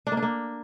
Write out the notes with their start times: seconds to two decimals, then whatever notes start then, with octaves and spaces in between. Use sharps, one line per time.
0.07 D4
0.12 A#3
0.17 D4
0.22 A#3